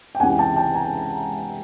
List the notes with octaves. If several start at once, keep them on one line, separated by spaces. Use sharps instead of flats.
G5
C#2 C3 E3 F#5 G#5
G5 A5
G5 A5
G#5 A#5